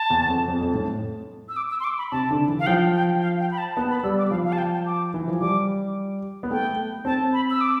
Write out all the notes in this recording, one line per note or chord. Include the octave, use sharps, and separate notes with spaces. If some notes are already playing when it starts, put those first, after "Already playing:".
Already playing: A5
E2
F2
F2
F2
A2
E6
D6
E6
C6
D6
B5
C3 A5
D3
E3
F5
F3 G5
G5
F5
G5
B5
A5
B3 A5
B5
G3 E6
D6
F3 F5
F5
A5
G5
A5
D6
E3
F3
G3 D6
B3
A3 G5
C4 A5
B5
E6
D6